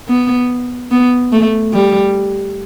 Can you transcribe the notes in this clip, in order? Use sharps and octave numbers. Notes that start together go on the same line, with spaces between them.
B3
B3
A3
G3